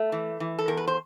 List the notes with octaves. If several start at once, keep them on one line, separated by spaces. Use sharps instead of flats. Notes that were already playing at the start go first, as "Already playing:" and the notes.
Already playing: A3
E3
E3
A4
E2 A#4
B4
C5